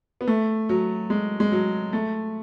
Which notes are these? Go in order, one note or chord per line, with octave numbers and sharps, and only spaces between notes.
B3
A3
F#3
G#3
G#3
F#3
A3